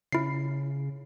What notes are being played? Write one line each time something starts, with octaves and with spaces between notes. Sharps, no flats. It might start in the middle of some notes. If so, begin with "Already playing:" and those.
C#3 E4 C7